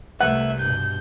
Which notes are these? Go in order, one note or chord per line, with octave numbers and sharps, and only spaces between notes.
C2 A3 B4 E5 F#5
G2 B2 G6